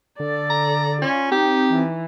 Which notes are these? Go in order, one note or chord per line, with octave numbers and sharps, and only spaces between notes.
D3 A4 D5
A#5
C#4 F4
C4 D#4 G4
E3